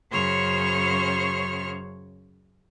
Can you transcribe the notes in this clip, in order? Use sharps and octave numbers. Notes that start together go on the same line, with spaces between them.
F#2 C#3 C5 C#5 C#6 F6